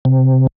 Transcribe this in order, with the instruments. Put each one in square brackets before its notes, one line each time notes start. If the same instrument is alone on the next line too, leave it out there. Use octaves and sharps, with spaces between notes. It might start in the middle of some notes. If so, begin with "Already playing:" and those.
[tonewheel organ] C3